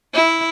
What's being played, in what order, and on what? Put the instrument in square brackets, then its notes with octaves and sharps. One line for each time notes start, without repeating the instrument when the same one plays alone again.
[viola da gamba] E4